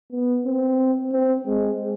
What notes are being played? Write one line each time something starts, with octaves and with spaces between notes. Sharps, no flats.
B3
C4
C4
G#3